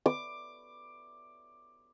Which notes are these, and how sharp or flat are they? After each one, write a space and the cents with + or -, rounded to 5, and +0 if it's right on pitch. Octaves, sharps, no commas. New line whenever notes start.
D6 +10